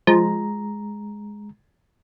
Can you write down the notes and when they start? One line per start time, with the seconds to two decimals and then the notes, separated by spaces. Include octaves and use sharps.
0.07 F3 G#3 A#5